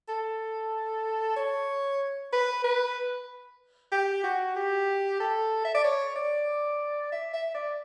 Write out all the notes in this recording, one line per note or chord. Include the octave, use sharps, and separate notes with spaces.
A4
C#5
B4
B4
G4
F#4
G4
A4
E5
D5
C#5
D5
E5
E5
D5